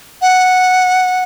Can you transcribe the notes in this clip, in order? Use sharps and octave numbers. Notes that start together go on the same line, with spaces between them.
F#5